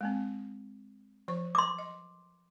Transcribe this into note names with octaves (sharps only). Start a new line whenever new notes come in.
G#3 A#3 C4
F3 C5 C#6
C6 D6
D#5